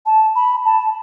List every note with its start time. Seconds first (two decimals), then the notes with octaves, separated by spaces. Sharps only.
0.06 A5
0.35 B5
0.65 A5